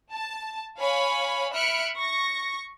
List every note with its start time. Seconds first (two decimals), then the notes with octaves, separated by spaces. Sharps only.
0.12 A5
0.78 C#5 F5 G#5 B5
1.53 E5 B5 F6 F#6 C#7 D7
1.97 C#6 A#6